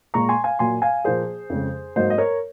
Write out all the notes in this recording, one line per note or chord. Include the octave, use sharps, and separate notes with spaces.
A#2 G#3 A#5 C#6
G#5 C6
F5 G#5
A#2 F#3 A#3 G#5 C6
F5 G#5
A#2 F3 A#3 G#4 C5
F2 C#3 G#3
G#2 F#3 A#3 C5 D#5
D#5
A#4 C#5